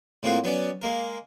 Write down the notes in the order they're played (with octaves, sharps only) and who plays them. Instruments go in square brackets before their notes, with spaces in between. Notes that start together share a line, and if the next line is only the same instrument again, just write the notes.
[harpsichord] A2 G#3 A#3 C4 F4 F#4
F#3 B3 C#4 D5
G#3 A#3 A#4